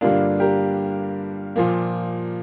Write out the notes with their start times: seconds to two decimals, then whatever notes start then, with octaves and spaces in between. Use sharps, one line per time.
0.01 G2 D3 G3 A#3 D4 F4
0.40 G4 A#4
1.56 A#2 F3 A#3